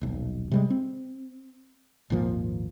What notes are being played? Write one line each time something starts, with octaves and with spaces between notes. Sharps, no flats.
D#1 B1
C3 G3 G#3
C4
G#1 D#2 A#2 F3